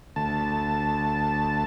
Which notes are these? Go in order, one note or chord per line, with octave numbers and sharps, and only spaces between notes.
D2 A5